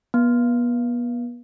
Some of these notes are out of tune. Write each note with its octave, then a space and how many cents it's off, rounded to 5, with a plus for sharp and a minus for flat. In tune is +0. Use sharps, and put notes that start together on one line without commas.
B3 -35